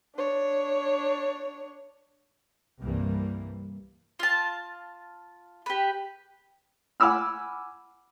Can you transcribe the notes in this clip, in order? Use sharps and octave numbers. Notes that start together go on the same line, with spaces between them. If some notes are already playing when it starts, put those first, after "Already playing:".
D4 C#5
C2 G2 E3 G3 A#3
F4 A5
G4 B4
F#5 G#5 B5 D6 E6 F6